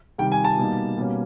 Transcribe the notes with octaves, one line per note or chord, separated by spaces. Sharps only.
C3 D#3 G3 G5
G#5
A5
B2 G3 A#3 D#4
B2 G3 A#3 C#4